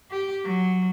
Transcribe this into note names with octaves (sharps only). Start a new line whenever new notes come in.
G4
F#3